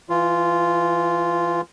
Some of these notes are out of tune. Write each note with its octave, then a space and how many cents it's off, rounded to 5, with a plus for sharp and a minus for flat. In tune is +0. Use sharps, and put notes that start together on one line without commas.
E3 +20 F4 -10